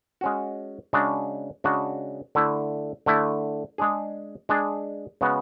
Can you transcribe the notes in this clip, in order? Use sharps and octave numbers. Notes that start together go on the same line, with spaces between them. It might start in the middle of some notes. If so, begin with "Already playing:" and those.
G#3 C#4 F#4
C#3 G#3 D4 F#4
C#3 G#3 D4 F#4
D3 A3 E4
D3 A3 E4
G#3 D4 G#4
G#3 D4 G#4
C#3 G#3 B3 F#4